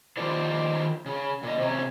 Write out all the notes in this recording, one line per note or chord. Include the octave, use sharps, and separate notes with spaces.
D#3 F3 A#3 G4 C5 D5
C#3
A#2 D#5
C3 C#4